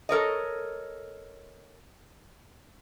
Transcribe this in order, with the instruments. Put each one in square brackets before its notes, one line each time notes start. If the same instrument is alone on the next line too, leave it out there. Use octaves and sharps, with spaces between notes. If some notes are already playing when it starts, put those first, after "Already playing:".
[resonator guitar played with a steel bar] A4 A#4 C#5 D#5